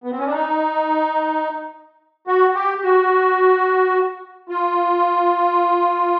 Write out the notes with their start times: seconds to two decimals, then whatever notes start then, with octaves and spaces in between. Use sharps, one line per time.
0.04 B3
0.12 C4
0.18 C#4
0.26 D4
0.32 D#4
2.27 F#4
2.55 G4
2.83 F#4
4.49 F4